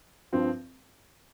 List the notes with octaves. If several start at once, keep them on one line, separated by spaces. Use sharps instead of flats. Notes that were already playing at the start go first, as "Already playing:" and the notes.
G2 F3 C4